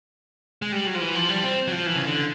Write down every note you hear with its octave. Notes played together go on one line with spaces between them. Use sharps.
G#3
G3
F#3
F3
E3
F3
G3
C4
F#3
F3
E3
C#3
D3